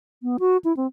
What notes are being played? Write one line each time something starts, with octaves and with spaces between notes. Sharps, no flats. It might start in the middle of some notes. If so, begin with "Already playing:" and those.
B3
F#4
E4
C4